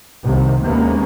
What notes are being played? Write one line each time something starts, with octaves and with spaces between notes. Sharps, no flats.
C2 C3 D#3
D#2 C3 G#3 A#3 B3 C#4